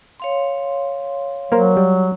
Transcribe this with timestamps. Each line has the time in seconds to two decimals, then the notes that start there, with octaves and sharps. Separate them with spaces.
0.20 C#5 F5 C6
1.52 F#3 A#3 A#4 C5
1.77 G3